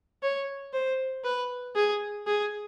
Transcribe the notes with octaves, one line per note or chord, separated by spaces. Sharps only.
C#5
C5
B4
G#4
G#4